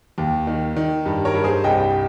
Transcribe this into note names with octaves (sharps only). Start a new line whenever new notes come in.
D#2
D#3
D#3
G2
A#4 C#5
G2
G#4 C5
C2 D#5 G5